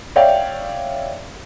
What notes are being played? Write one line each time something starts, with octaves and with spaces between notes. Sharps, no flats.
C#5 D5 E5 F5 G5